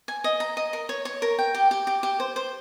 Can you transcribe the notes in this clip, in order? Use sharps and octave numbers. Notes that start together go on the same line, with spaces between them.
G#5
D#5
A#5
D#5
A#4
C#5
C#5
A#4
G5
G4
G4
G4
G4
C5
C5